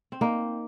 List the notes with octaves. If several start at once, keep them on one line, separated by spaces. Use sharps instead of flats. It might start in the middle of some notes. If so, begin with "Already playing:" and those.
C4
A#3 D#4